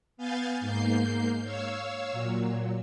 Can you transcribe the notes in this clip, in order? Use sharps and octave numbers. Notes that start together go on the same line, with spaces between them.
B3 F5 G#5 G6 A6
G#2 A#3 G6 C7
C#5 F5 E6
A#2 F#3